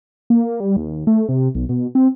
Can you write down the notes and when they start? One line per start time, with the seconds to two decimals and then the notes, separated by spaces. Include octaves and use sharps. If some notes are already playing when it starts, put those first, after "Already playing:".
0.30 A#3
0.60 G3
0.77 D#2
1.07 A3
1.29 C3
1.55 B1
1.69 B2
1.95 C4